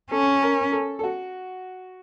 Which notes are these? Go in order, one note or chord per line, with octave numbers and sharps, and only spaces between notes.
C#4 A4
A#4
A4
A4
F#4